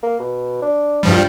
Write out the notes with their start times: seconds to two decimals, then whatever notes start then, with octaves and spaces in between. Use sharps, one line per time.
0.02 A#3
0.19 B2
0.62 D4
1.03 G2 F3 G3